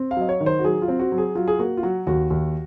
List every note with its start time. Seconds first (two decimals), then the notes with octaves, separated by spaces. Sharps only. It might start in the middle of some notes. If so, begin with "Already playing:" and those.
Already playing: C4
0.11 F5
0.17 F#3 D#5
0.29 C#5
0.40 D#3
0.46 C5
0.59 F#4
0.64 F#3 G#4
0.82 F4
0.88 C4
1.00 F#4
1.12 F#3
1.18 G#4
1.35 F#3 F4
1.48 G#4
1.59 A#3 F#4
1.77 F4
1.83 F#3 F#4
2.07 D#2 F#4
2.30 D#2